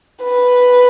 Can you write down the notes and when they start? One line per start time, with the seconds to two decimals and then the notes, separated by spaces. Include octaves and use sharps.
0.24 B4